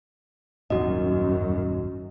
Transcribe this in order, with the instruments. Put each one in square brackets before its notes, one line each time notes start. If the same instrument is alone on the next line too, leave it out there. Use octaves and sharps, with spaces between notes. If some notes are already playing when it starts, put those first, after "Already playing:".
[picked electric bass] D#1 G#1 [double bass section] F#2 [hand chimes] F#4 D#5